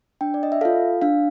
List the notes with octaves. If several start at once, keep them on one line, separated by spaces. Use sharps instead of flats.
D4 G5
D5
D#5
E5
F4 A4 F5
D4 F5